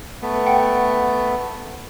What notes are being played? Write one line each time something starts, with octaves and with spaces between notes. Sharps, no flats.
A3 B3
F#5 G5